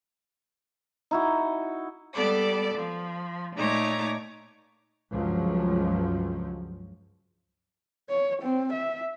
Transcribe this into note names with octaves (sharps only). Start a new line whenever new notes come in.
D#4 E4 F#4
G3 B3 A4 D5 D6
F3
A#2 A3 D#4 C#5 A#5 D6
C#2 G2 F3 F#3
C#5
C4
E5